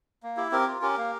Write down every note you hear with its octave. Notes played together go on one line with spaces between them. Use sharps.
A#3
E4 G4
C4 G4 A#4
F4
C#4 G4 A#4
A#3